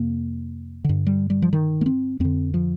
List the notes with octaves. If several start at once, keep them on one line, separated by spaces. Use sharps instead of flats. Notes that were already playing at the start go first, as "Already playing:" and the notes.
Already playing: F2 C3 A#3
G2 D3
G3
G3
F3
D#3
A#3
C4
F2 D3 C4
F3